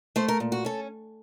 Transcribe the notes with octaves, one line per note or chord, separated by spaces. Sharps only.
A3 C5
A#4
A#2
F#4
C#4 A4